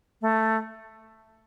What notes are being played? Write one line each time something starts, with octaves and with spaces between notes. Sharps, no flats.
A3